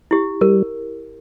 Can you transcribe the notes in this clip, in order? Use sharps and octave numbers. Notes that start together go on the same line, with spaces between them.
E4 G4
G3 A#4